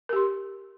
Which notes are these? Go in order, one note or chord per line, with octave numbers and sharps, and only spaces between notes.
G4 A#4 C6